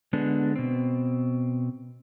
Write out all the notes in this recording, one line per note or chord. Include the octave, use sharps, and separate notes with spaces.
D3 G#3 B3 D4
B2 C4